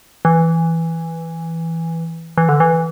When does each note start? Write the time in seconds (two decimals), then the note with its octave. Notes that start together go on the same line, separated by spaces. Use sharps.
0.25 E3
2.38 E3
2.49 D3
2.60 E3